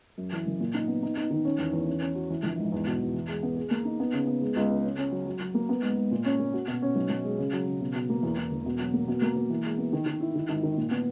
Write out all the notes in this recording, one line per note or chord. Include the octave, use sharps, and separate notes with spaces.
F#2
E3
F#1
A#2
D#4
B3
D#4
D#4
D#3
C#4
E2
E2
C#4
C#4
F#4
E3
A#1
G#2
E2
B2
E2
E3
G#3
B3
G#4
A#3
D#4
B3
C#3
B3
G#3
C#2
C#3
C#4
C#4
F#3
F#3
F#3
A#3
B3
G#2
G#2
A#2
C#4
A#3
F#4
B2
C#4
B1
B1
G#3
C#3
F#3
C#3
B2
B2
A#3
E2
E2
E1
B2
F#3
A#3
B2
A#3
A#3
E3
G#3
B3
D#3
D#3
E4
D#3
G#1
D#3
A#2
B3